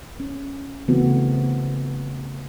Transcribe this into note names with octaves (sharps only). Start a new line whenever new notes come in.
C#4
C#3 E3 A3 B3 C4 F#4